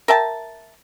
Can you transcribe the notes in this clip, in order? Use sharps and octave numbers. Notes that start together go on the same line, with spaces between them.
A#4 E5 G5 A5